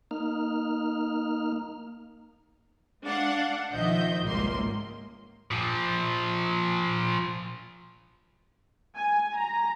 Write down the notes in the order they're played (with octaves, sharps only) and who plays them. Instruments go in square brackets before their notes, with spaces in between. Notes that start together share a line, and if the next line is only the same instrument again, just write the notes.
[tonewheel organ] A#3 D#4 F6
[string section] G#3 D4 F5 F#5
B1 D#3 F3 D#5 E5 G6
G#1 C#2 G3 A#3 C6
[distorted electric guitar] A#2 F3
[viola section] G#5
A#5